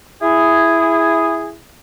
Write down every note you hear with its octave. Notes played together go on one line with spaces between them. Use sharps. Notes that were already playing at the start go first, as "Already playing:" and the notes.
E4 G#4